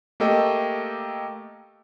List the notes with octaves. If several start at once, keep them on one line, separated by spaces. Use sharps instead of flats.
A3 A#3 G4 A4 D#5 G5